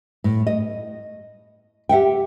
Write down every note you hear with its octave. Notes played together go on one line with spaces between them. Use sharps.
A2
D#5
G4 E5 F#5 G5